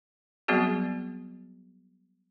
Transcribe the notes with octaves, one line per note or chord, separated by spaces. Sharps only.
F#3 G3 B3 C4 F#4 G#4